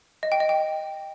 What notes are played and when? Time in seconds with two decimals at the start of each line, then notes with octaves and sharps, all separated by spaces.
0.23 D#5
0.32 G5
0.40 D#5
0.49 G5